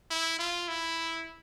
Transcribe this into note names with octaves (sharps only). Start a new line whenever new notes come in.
E4
F4
E4